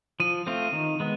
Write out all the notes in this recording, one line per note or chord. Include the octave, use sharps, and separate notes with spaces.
F3 D#7
A3 C4 F4
D#3
G#3 B3